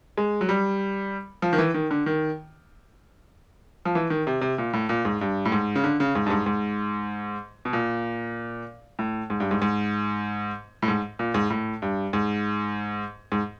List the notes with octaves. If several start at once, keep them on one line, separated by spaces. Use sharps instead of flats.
G#3
F#3
G3
F3
D#3
E3
D#3
D3
D#3
F3
E3
D#3
C3
C3
A#2
A2
A#2
G#2
G2
A2
G#2
C#3
D3
C#3
G#2
G2
G#2
G#2
B2
A#2
A2
G#2
G2
G#2
G#2
A2
G#2
A#2
G#2
A2
G2
G#2
G#2